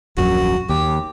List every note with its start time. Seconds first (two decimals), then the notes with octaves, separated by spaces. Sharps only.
0.17 D#1 A#1 F#2 F#4
0.69 D#2 G4